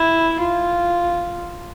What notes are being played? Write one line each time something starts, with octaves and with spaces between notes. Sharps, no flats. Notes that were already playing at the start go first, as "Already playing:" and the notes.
Already playing: E4
F4